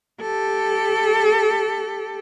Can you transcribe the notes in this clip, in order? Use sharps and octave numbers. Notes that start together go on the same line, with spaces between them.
G4 A4